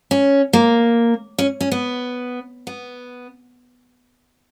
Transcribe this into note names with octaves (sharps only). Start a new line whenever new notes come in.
C#4
A#3
C#4
C#4
B3
B3